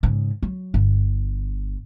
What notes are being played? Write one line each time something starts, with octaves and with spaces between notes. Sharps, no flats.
G#2 C#3
F#3
G1